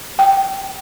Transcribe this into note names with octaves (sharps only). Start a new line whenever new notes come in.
G5